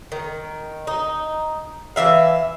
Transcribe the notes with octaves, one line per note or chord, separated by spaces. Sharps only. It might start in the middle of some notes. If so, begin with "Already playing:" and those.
D#3
D#4
E3 F#3 E5 F5